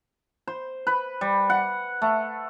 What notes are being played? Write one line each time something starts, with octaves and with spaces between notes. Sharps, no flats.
C5
B4
G3
F#5
A3